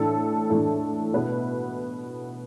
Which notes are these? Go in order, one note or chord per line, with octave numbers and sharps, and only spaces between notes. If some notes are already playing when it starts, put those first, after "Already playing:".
Already playing: A2 E3 A3 D4 A4
A2 E3 A3 D4 A4
B2 B3 E4 B4